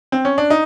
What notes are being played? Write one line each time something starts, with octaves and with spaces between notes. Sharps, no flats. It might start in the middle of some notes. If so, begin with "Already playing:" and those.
C4
C#4
D4
D#4